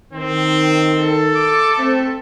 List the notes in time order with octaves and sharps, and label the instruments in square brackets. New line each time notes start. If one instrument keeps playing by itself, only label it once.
[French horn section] D#3 [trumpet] C4
[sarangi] A4
[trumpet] D6
[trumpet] A3 [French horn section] C4